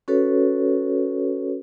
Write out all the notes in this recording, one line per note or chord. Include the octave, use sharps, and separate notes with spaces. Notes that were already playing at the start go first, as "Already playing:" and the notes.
C#4 F#4 A4 B4 C#5